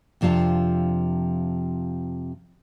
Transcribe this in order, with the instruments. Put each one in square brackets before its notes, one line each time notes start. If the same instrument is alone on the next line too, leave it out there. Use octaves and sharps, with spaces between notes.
[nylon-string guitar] F2 C3 F3 D4 F5